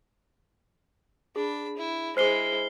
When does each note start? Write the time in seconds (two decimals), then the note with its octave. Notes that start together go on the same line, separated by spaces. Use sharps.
1.36 D4 G#4 B5
1.77 E4
2.17 G#3 E4 G#4 C5 F6 C7 G7